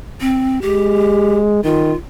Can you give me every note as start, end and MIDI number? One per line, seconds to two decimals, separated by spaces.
0.21 0.59 60
0.62 1.63 56
0.62 1.37 67
1.65 1.92 51
1.65 1.96 65